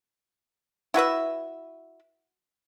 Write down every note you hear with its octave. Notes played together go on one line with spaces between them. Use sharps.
E4 F#4 B4 E5